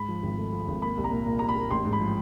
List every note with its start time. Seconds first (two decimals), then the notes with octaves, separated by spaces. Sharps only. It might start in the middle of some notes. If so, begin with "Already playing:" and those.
Already playing: G#2 B5
0.08 F3
0.23 G#1
0.37 A3
0.52 F3
0.67 G#1
0.82 A#3 B5
0.97 C2
1.04 A#5
1.12 A#2
1.26 A#2
1.39 A#3 A#5
1.49 B5
1.56 A#3
1.70 A1 C6
1.85 G#2
1.93 B5
2.00 F3